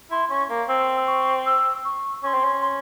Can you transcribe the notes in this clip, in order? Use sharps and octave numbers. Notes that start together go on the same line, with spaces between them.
E4 C6
C#4 C#6
A#3
C4 E6
C#6
E6
C#6
C#4 C6 C#6
C4
C#4
C6